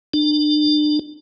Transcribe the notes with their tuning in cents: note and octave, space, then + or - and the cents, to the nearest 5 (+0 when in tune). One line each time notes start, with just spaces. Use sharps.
D4 +35